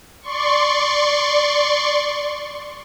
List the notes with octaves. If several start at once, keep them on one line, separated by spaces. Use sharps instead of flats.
D5 C6 C#6